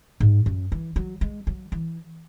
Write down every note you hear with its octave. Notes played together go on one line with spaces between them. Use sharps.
G#2
F#2
E3
F#3
G#3
F#3
E3